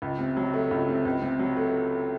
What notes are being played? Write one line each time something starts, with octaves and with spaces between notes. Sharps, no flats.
C#2
C3
F#3
A3
C#2
C3
C#2
C3
F#3
A3